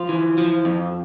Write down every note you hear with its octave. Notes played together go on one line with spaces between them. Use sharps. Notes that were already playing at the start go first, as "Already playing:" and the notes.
Already playing: F3 F4
E3
F3
F2